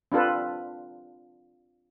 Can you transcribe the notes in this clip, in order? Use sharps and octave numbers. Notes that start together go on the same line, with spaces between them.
C4 D4 F4 A4 B4